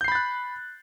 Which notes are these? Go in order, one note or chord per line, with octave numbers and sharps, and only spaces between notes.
B5 F#6 G6 A6 C7